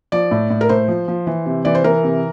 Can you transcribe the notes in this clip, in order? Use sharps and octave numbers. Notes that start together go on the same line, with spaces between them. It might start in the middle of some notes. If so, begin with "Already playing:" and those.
F3 D5
A2
A2
A#4
A2 C5
F3
F3
E3
C3
E3 D5
C5
E3 A#4
C3